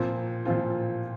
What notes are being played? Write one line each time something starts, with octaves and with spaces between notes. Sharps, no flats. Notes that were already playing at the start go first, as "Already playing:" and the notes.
Already playing: A#2 F3 C4 F4
A#2 F3 C4 F4